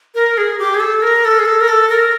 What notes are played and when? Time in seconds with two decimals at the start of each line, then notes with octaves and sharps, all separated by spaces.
0.15 A#4
0.38 G#4
0.59 G4
0.74 G#4
0.80 A4
1.02 A#4
1.25 A4
1.39 G#4
1.45 A4
1.61 A#4
1.68 A4
1.89 A#4